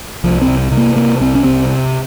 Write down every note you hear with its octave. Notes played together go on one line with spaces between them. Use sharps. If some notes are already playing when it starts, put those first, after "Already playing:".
C2 F3
C4
C3
C3
A#3
C3 A#3
C2 C4
C#4
C3 C4